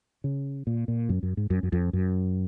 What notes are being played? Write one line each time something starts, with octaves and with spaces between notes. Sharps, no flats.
C#3
A#2
A#2
F#2
F#2
G#2
F#2
F#2
F2
F#2